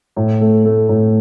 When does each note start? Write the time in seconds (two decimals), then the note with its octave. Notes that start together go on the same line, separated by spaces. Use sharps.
0.16 A2
0.41 A3
0.65 A3
0.89 A2